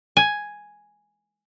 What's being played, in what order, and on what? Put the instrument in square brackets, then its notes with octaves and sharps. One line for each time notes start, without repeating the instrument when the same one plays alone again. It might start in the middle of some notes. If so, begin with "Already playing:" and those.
[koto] G#5